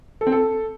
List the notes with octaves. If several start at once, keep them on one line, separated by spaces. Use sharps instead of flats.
A4
C4
A4